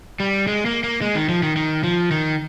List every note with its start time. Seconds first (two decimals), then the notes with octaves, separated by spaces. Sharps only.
0.20 G3
0.48 G#3
0.66 A#3
0.84 A#3
1.02 G#3
1.15 D#3
1.29 F3
1.43 D#3
1.56 D#3
1.84 F3
2.11 D#3